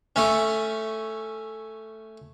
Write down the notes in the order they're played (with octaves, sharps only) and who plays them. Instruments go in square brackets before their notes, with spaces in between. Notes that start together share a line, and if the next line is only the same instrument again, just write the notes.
[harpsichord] A3 C#4